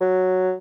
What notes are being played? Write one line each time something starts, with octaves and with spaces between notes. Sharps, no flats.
F#3